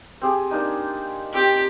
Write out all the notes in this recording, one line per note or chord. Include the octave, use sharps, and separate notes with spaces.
C4 G4 G#4
A#3 D4 D#4
C4 G4